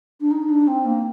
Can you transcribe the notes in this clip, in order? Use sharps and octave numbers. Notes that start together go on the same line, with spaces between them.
D4
D#4
D4
C4
A#3